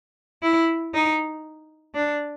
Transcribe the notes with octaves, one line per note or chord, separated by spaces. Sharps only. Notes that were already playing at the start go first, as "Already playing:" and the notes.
E4
D#4
D4